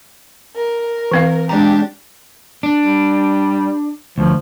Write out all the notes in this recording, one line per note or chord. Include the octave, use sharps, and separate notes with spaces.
A#4
E3 C4 F5
G#3 D4 G4 A#5
D4
G3
D2 F3